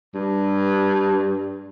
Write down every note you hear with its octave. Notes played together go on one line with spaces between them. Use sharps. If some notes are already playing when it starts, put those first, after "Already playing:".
G2